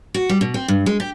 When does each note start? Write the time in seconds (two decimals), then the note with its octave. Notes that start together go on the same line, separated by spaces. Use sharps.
0.14 F#4
0.29 G3
0.41 B2
0.54 C4
0.68 G2
0.86 G#3
1.00 G4